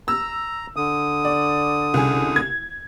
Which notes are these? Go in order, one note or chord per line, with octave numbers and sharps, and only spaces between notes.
A#5 E6
D3 D#6
D5
C2 C#3 G#5
G#6